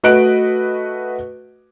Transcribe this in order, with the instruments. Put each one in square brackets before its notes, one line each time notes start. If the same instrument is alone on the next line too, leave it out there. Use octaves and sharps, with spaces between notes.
[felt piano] A3 F#4 B4 D#5 F#6 D7